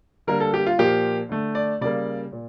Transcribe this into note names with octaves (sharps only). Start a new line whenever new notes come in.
D3 G3 A#3 A#4
A4
G4
F4
A#2 F3 A#3 G4
D3 A3
D5
C#3 G3 A#3 D5
A#2